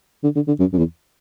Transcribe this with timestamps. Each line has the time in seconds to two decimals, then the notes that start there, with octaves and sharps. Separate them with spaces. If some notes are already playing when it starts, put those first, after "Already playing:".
0.24 D3
0.36 D3
0.47 D3
0.59 F#2
0.73 F#2
0.78 E2